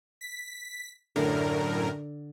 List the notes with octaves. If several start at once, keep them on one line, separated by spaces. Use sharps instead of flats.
B6
F#2 A2 D3 A#4